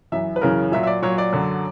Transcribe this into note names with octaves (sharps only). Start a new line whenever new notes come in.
F#2 E3 E5
B4
F#2 C#3 E3 A#4
A#2 F#3 E5
E5
D5
A#2 F#3 C#5
D5
F#2 D3 F#3